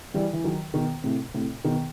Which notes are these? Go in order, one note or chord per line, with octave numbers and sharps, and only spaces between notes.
E3 G3
E3
D#3 F#3
B2 D#3
A2 C3
A2 C3
B2 D#3